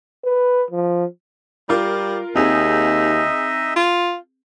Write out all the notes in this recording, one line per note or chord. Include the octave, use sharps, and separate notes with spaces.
B4
F3
G3 F4 A#4
D#2 C4 D#4 G#4 D#5 E5
F4